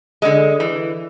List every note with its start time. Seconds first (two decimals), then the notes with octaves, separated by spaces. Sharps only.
0.22 D3 G#3
0.60 E3